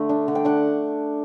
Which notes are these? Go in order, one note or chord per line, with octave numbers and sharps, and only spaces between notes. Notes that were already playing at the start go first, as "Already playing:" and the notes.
Already playing: D3 A3
D4
D3
G5
D4 F#5